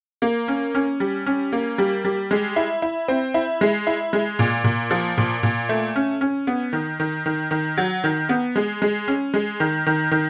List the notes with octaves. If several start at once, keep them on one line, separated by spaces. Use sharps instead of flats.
A#3
C#4
C#4
G3
C#4
A#3
G3
G3
G#3
E4
E4
C4
E4
G#3
E4
G#3
A#2
A#2
F3
A#2
A#2
A3
C#4
C#4
B3
D#3
D#3
D#3
D#3
F#3
D#3
B3
G#3
G#3
C#4
G#3
D#3
D#3
D#3